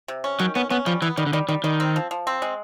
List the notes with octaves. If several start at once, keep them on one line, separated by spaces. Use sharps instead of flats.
C3
C#4
D#3 F#3
B3 C#4
B3 C#4
F3 G3
E3 B3
D#3 G3
D3
D#3 G3
D#3 G3
D#3 G3
C4
F3
F3
C4
G#3